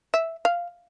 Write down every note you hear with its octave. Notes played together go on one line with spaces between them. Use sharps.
E5
F5